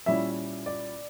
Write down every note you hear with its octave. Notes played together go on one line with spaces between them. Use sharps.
A#2 G3 C#4 E4 E5
D5